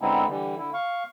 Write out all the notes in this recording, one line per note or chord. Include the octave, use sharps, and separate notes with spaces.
D3 G#3 B3 C4 D#4 E4
D3 E3 G3
D3 E4
F5 C#6